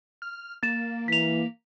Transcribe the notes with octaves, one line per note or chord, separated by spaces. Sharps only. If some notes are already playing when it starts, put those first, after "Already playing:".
F6
A#3 A6 E7
E3 B6 F7